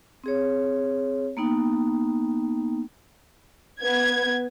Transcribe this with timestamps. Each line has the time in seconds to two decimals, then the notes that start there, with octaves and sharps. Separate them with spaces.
0.24 C4 G#4 C#5
1.37 A#3 B3 D#4 G5
3.81 B3 G#6